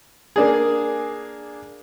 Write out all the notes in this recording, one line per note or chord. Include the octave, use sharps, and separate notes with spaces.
A#3 D4 G#4